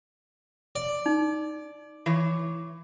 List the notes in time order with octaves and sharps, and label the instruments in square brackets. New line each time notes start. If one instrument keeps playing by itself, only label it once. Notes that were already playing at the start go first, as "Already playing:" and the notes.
[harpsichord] D5
[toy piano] D#4
[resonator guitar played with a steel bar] E3 C#5